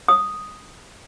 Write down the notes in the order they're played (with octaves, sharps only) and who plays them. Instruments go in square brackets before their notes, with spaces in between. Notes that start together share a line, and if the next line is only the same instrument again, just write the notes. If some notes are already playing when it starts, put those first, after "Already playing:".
[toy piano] D#6